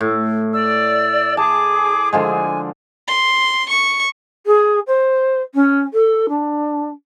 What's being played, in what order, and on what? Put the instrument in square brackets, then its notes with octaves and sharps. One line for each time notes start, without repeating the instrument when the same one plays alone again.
[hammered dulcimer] A2
[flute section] D5 [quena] E6
[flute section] G#4 [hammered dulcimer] A5 [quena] D6
[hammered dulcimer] D3 F3 G#3 [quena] G#5
[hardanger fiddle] C6
C#6
[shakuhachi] G#4
C5
C#4
A4
D4